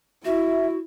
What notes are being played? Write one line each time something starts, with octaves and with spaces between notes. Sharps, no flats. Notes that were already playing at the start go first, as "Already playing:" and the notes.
E4 F#4 E5